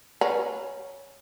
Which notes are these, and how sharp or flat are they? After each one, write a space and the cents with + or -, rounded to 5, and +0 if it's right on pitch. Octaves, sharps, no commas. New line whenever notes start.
C#4 +0 B4 -25 A#5 +20